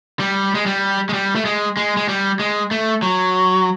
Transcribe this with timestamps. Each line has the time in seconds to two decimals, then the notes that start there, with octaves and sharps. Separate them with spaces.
0.20 G3
0.55 G#3
0.66 G3
1.09 G#3
1.13 G3
1.35 A3
1.45 G#3
1.77 G#3
1.97 G#3
2.09 G3
2.39 G#3
2.71 A3
3.02 F#3